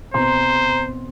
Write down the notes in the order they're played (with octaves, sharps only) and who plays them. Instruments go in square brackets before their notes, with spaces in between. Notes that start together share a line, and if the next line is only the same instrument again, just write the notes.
[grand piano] B2 C4 C6 [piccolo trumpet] C5 [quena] A#5